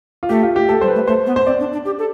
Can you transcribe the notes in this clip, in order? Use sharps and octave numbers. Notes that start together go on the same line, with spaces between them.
F4
A3 G4
F4
G4
A3 A4
G3 C5
B4
A3
A3 C5
B3
C5
C4 D5
D4
D4
G4
A4